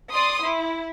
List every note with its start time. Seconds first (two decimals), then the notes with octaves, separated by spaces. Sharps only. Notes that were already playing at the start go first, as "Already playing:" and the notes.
0.12 D5 C6 D#6
0.43 E4